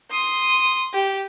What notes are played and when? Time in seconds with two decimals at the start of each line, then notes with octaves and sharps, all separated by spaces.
0.11 C6 D#6
0.93 G4